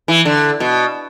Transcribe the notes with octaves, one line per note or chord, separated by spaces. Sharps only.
E3
D3
B2